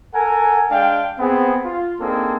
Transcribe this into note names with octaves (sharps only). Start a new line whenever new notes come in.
A4 A#4 F#5 G#5
G#3 D4 F5 G5
B3 C4 G#4
F4
A#3 C4 D4 D#4 G#4 A4